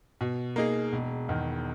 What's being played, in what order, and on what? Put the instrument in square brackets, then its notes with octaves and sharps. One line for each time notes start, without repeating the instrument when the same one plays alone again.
[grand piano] B2
A#3 D#4 G#4
E1
E2 D#3